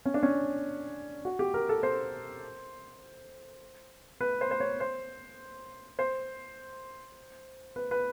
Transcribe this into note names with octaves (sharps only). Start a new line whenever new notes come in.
C#4
D4
C#4
F#4
G4
A#4
A4
C5
B4
C5
C5
C#5
C5
C5
B4
B4